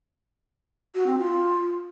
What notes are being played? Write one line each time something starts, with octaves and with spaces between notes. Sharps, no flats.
F#4
C4
F4